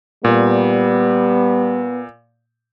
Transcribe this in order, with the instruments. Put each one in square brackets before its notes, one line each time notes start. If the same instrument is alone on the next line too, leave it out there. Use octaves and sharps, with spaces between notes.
[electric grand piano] A#2 [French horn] G3 [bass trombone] B3